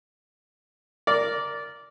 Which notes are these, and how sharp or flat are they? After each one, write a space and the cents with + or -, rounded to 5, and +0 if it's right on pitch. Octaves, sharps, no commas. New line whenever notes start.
A#4 -5 D5 -15